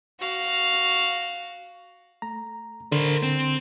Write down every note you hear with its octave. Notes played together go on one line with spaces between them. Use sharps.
F#4 F5
A3 A#5
D3 A#4 C5
C4